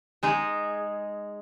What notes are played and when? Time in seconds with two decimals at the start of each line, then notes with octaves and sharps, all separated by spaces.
0.23 G#3 D#4 G#4